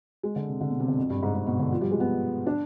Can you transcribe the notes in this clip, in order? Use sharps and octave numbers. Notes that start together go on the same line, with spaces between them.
G#3
D3
C3
D3
B2
C3
D3
F2
G2
G#2
G#2
B2
D3
F3
G3
G#3
B3
D4